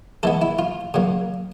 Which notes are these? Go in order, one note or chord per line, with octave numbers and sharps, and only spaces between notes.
E3 G#3 B3 A4
E4
F4
C#3 F#3 A#3